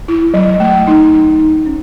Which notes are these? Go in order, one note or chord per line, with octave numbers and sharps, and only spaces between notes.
E4
F#3
A3
D#4
D#4
D#4
C#4